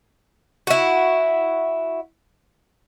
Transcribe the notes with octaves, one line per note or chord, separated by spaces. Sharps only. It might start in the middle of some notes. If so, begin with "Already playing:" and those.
E4 F#4